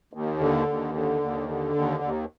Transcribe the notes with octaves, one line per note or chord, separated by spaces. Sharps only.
D#2
D3
D#2
D3
D#2
D3
D#2
D#2